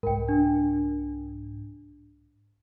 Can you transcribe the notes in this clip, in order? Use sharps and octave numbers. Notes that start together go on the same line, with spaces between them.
C2 G#2 A#4 G5
D4